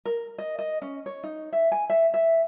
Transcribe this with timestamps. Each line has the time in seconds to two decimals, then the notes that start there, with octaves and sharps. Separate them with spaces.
0.05 A#4
0.38 D#5
0.59 D#5
0.82 C#4
1.06 C#5
1.23 D#4
1.52 E5
1.72 G#5
1.90 E5
2.14 E5